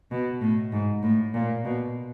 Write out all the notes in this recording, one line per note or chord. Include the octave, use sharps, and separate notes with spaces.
B2
A2
G#2
A2
A#2
B2